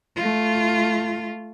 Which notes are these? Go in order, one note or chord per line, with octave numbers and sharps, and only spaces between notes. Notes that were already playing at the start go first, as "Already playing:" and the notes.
A3 F4